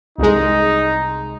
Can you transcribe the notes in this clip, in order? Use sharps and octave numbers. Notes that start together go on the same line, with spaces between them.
C2 G#3 D#4